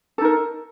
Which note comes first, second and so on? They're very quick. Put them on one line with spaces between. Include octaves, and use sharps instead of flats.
A4 D#4 A#4